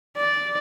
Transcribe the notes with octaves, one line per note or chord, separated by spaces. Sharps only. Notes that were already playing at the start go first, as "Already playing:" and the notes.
D5